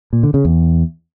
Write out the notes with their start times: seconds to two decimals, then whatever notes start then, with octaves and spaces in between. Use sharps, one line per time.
0.13 A#2
0.23 D3
0.34 C#3
0.45 E2